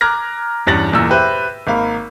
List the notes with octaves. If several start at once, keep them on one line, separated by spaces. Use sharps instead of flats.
A#5 D6 F6 F#6 G#6 A#6
E2 G2 C#4 A6 A#6 F#7
F#1 E2 A#2 E6
G4 B4 C5 E5
G#1 A#3 F5 B5